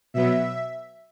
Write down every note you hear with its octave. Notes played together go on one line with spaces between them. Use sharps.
B2 F#3 B3 E5